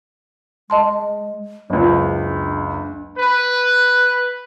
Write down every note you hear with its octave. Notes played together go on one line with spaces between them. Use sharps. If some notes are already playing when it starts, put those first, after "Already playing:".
G#3 D#5 A5 C6
F#1 C#2 D4
B4